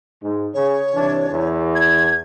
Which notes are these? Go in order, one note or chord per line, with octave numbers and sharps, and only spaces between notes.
G#2
C#3 C#5
C2 E3 D4
E2
G#6